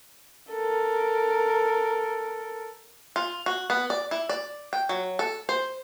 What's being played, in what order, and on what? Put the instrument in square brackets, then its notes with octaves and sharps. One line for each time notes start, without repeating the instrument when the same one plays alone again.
[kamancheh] A4 A#4
[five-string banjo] F4
F#4
B3
D5
E4
D5
G5
F#3
A4
C5